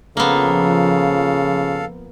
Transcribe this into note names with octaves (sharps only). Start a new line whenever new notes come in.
C#3 F3 A#3 B3 A4 F5